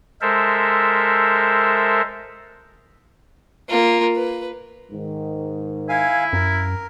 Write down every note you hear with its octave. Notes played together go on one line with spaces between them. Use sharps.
G#3 A4 A#4 C5 E5
A#3 F4
B4
G#2 D#3
E4 F5 G#5
F#2 A#4